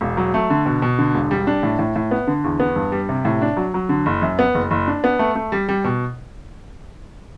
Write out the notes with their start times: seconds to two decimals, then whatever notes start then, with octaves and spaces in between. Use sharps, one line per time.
0.01 E1
0.17 F#3
0.34 A3
0.50 D3
0.66 B2
0.82 B2
0.99 D3
1.14 E1
1.31 G3
1.47 D4
1.63 A2
1.79 A2
1.96 A2
2.11 B3
2.27 D3
2.44 E2
2.60 B3
2.76 G2
2.92 G3
3.09 C3
3.25 A2
3.41 D4
3.57 F#3
3.74 F#3
3.89 D3
4.06 F#1
4.22 F#2
4.39 B3
4.55 F#1
4.71 F#1
4.88 D4
5.04 B3
5.19 A3
5.35 A3
5.52 G3
5.69 G3
5.84 B2